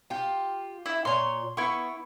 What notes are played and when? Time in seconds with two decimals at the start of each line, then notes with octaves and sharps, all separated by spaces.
0.10 F4 G4
0.86 E4
1.05 A#2 C#5 C6
1.57 B3 E4 C#6